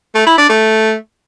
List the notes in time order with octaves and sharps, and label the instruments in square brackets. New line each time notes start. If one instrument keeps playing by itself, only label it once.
[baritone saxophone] A3
E4
D4
A3